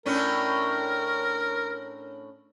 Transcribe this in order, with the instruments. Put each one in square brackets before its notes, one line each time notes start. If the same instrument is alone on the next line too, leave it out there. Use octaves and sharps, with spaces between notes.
[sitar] A2 C#4 D4 [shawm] A#4